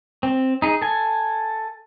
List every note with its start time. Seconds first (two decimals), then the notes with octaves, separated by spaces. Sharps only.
0.23 C4
0.62 D#4 G#4
0.81 A4 G#5